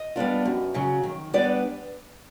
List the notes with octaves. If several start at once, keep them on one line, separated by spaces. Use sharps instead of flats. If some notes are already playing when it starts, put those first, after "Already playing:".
Already playing: D#5
G3 B3 D4 F4
F#2
C#3 F#3
D#3
G3 B3 D4 D5